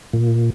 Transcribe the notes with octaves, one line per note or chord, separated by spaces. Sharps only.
A#2